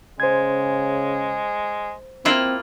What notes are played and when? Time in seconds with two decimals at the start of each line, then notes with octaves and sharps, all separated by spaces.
0.20 C#3 G#3 C5 G#6
2.25 A#3 C4 E4 F4